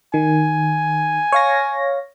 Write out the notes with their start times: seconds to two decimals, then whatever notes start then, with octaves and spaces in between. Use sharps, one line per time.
0.14 D#3 G#5
1.32 C#5 F5 A#6